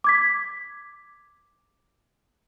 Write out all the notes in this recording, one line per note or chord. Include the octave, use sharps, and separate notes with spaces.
D6 G#6 B6